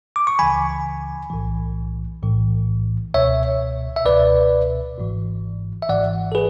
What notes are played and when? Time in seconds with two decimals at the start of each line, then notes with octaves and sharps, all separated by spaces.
0.16 D6
0.27 C#6
0.39 C#2 C#3 E3 G#5 B5
1.30 B1 A2 E3
2.22 B1 A2 E3
3.14 C#2 B2 C#5 E5
3.96 E5
4.06 C#2 B2 B4 D5
4.98 G#1 G#2 E3
5.82 E5
5.89 G#1 G#2 E3 D5 F#5
6.32 A4
6.35 G#4 B4